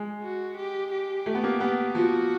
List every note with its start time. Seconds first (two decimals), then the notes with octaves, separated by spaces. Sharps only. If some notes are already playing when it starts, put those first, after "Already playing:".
Already playing: G#3
0.23 F#4
0.57 G4
0.91 G4
1.26 A3
1.35 B3
1.44 A#3
1.60 B3
1.95 F3 F#4